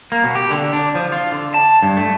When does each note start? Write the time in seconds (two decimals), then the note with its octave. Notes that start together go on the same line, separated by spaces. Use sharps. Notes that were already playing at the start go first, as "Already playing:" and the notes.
0.12 A#3
0.24 B2
0.35 G4
0.50 D3
0.73 D4
0.95 F3
1.12 F4
1.32 D3
1.54 A5
1.83 G2
1.97 A3